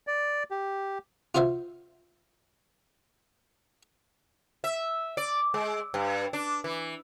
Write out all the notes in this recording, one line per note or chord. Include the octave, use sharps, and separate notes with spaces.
D5
G4
F4 F#4 C5 E5 F5
E5
D5
G#3
G2
D4
E3